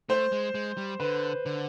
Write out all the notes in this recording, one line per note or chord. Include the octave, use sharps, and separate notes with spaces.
A3 C5
G#3
G#3
G3
D3 B4
D3